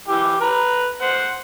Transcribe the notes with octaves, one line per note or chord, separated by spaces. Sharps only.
E3 G4
B4 A#5
C5 F#5